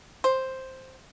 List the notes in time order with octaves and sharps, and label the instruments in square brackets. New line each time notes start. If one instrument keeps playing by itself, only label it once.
[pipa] C5